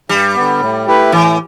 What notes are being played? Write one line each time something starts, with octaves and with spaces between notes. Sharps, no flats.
G2 G3
D3 B3
A2
A3 E4 G4 B4
A2 E3